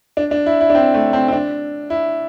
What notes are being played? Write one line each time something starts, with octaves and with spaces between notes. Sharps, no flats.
D4
D4
E4
E4
D4
C4
A3
C4
C4
D4
E4